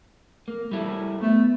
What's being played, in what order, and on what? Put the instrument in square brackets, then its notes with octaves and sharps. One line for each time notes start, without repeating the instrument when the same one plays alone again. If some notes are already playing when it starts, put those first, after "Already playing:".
[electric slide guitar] A#3
G3 E4 A4
[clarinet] A3 [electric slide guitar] B3